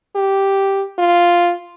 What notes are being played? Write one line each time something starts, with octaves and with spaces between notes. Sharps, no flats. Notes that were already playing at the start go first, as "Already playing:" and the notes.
G4
F4